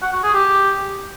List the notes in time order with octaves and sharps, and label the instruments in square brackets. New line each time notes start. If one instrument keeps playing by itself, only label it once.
[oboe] F#5
F#4
G#4
G4